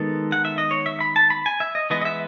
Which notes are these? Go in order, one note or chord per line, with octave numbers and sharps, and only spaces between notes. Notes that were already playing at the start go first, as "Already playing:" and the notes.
Already playing: D#3 G#3 B3 A4
F#5
E5
D#5
C#5
E5
B5
A5
B5
G#5
E5
D#5
E3 G#3 B3 D#5
D#5
E5